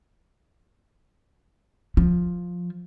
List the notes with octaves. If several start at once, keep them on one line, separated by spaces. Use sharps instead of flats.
F3